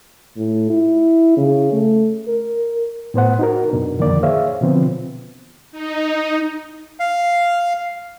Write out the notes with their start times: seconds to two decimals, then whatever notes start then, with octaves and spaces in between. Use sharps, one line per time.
0.37 A2
0.70 E4
1.37 C#3
1.72 A3
2.28 A#4
3.14 A2 B3 C5 F#5
3.39 D#4 F#4 A#4
3.70 F#2 B2 D4 A#4
3.99 F2 D3 D#3 F3 A#3 D5
4.23 G#4 C5 C#5 E5 F5
4.61 B2 D3 F3 B3 C4
5.72 D#4
7.00 F5